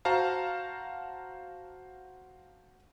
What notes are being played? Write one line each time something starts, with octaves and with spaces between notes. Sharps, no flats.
F#4 C5 F5 A5 A#5